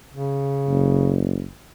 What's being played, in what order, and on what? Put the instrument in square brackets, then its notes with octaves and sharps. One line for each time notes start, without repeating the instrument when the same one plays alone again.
[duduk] C#3
[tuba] F#1